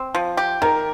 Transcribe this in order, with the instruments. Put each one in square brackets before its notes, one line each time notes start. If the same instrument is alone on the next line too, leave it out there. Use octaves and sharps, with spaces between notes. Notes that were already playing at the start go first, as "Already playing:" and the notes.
Already playing: [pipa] C4
F3
G4
[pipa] D#3 [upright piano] A#4